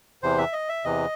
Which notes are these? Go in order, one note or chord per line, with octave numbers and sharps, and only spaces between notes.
E2 C3 E3 C5
E5
D#5
E5
E2 C3 E3 D#5